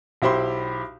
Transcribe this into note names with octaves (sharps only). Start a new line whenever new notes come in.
B1 E4 G4 C5 B5 C6